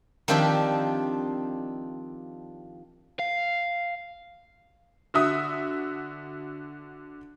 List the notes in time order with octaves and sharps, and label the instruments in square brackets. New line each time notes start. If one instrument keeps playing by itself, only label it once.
[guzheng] D#3 F3 C4 D4 G4 E5
[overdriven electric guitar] F5
[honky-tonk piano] D3 F#4 E5 D#6